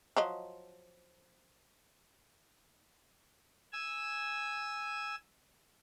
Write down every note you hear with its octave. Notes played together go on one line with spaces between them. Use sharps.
F3 F#3 D#5
G#5 E6